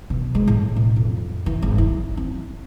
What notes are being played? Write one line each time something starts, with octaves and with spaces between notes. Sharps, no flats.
B2
G#3
A2
B2
F2
E3
G#1
E4
C4